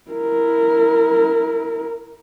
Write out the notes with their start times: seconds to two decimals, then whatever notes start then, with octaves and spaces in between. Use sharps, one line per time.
0.11 E4 A#4